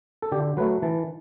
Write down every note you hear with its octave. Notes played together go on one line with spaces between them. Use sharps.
A4
D3 G4
F#3 A3 B4
E3 A5